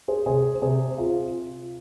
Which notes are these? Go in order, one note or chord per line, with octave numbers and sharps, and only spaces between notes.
G#4 C5
C3 G#4 C5
C3 G#4 C5
F4